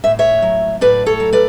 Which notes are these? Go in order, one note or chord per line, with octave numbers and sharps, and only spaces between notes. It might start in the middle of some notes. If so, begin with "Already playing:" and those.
A2 E5
C#5 E5
F#3
A2 B4 D5
A4 C#5
F#3
B4 D5